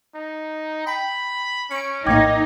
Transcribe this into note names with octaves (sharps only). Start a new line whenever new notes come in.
D#4
G5 B5
C#4 C#6 D7
A#1 A2 A#3 D#4 G5 D6 G#6